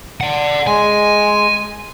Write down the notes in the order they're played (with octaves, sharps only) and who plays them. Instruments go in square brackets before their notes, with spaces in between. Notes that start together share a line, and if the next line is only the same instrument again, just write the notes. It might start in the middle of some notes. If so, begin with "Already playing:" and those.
[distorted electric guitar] D5 F#5
[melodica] G#3 [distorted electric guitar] G#5